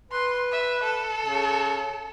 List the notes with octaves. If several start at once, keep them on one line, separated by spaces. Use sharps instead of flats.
B4 C6
E5
A4
C#3